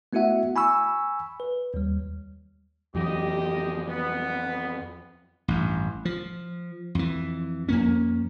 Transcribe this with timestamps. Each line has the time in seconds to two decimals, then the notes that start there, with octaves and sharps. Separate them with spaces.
0.13 A3 B3 E4 F#4 E5 F#5
0.56 G#5 B5 C#6 E6
1.40 B4
1.74 D#2 G3
2.95 F2 E3 F#3 G4 D#5
3.88 B3
5.48 A1 G2
6.05 F3
6.95 F2 E3
7.69 F2 A#3 C#4